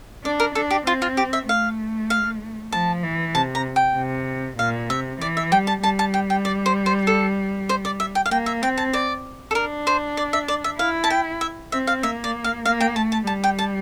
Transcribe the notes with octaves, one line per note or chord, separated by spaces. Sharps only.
D4 D5
A#4
D4 A4
G4
C4 F4
F4
G4
E5
A3 F5
F5
F3 A5
E3
C3 A5
A#5
G5
C3
A#2 F5
C3 E5
E3 D5
E5
G3 G5
A5
G3 A5
A5
G5
G5
D5
C5
C5
A4
C5
D5
E5
G5
F5
A#3 G5
E5
C4 G5
A5
D5
A4
D4 A#4
C5
D5
E5
D5
E5
E4 F5
A5
G5
E5
C4 E5
F5
A#3 E5
D5
F5
A#3 F5
G5
A3 A5
A5
G3 A5
G5
A5